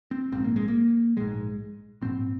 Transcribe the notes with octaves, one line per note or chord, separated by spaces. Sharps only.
C4
A#1 G#2 C4
A#3
G#3
A#3
A#1 G#2 G#3
A#1 G#2 C4